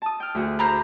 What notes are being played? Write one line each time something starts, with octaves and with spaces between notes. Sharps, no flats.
A5 D#6
G5 F6
D2 F#4 G#4
C5 A#5 B5